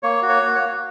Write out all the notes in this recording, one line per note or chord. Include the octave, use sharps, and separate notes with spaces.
A#3 C#5
F#4
C#5
A#3
C#5
A#3